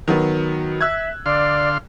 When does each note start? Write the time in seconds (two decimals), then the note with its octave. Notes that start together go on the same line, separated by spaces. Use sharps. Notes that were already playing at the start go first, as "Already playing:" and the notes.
0.08 D#3 F#3 B3
0.81 E5 E6 F#6 G#6
1.26 D3 D5 F5 C6